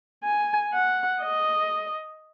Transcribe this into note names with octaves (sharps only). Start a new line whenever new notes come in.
G#5
F#5
D#5